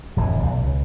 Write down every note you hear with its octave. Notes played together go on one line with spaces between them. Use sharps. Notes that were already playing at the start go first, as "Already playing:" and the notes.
D1 F2 D#3 E3
B1 E2
C#2